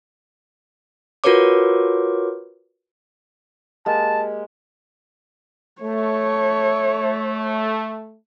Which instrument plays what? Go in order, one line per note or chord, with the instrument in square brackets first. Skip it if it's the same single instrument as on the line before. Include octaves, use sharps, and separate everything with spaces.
[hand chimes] F4 F#4 A#4 B4 C#5 D6
[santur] G#3 A#3 G4 [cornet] A5
[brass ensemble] A3 [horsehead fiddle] C#5